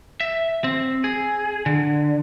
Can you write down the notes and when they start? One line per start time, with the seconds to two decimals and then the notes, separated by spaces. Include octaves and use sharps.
0.21 E5
0.64 C4
1.04 G#4
1.66 D3